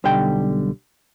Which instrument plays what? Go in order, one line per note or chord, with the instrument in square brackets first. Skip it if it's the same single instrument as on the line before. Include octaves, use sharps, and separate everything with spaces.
[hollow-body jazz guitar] B1 D3 G3 G5